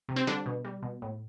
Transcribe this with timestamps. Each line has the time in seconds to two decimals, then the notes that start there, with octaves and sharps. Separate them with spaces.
0.09 C3
0.16 C4
0.27 D3 G3 D4
0.46 B2
0.65 G3
0.83 B2
1.02 A2